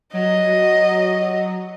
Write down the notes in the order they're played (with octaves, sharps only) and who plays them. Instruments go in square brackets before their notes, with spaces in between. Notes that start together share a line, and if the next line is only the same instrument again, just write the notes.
[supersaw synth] F#3 [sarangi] D#5